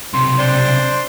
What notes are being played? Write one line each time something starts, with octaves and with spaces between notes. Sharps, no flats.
B1 C3 C6
D4 C5